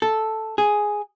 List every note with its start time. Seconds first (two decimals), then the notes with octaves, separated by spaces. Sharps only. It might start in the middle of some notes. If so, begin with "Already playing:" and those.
0.02 A4
0.58 G#4